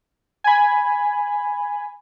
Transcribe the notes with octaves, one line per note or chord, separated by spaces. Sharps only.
G#5 B5